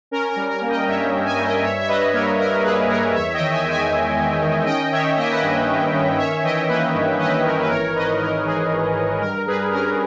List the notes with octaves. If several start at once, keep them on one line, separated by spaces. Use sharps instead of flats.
C#4 A#4
A#4
G3
A#4
A#3
D#5 G5
G2 C#5 E5
C#4
E5 G#5
G3
D#5 G5
G2 C#5 E5
E5
G3 B4 D#5
A#3 A#4 C#5
G2 A#4
G2 G#4 B4
G3 A#4 C#5
E2 C#5 E5
D#5 G5
D#3
E5 G#5
G#3
E5 G#5
E2
E2
D#3
C#4 D#5 G5
D#3 C#5 E5
A#3 D#5
E5
B4 D#5
G2
C#4
D#3
C#4 C#5 E5
E3 D#5 G5
A#3 B4 D#5
G2
C#4 B4 D#5
E3 A#4
B4
G#1 A#4 C#5
G#2 B4 D#5
E3 A#4
G#1 G#4
G#1
G#2
G2 A#4
G3 G#4 B4
C#4 A#4